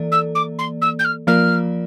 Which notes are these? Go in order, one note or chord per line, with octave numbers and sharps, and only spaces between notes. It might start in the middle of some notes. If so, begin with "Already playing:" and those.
Already playing: E3 A#3 A4 D5
E6
D6
C6
E6
G6
F6
F3 A#3 F4 A#4 D5 F6